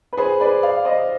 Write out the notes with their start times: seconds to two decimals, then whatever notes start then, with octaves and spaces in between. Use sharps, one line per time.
0.13 B4
0.17 G#4 C5
0.40 B4 D5
0.63 D5 F5
0.85 C5 D#5